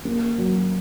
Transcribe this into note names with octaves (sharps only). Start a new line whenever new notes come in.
A#3
F#3